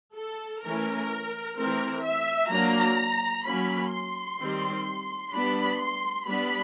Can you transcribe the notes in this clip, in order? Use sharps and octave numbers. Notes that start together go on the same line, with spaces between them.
A4
E3 A3 C#4 A#4
E3 A3 C4 A#4
E5
F#3 A#3 D4 A#5
F#3 A#3 C#4 B5
C6
D#3 G3 C4
G3 B3 D4 B5
C6
G3 B3 D4 B5